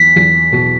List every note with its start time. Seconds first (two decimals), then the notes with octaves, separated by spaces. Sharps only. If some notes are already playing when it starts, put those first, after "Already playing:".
Already playing: E2 B6
0.16 E2
0.52 B2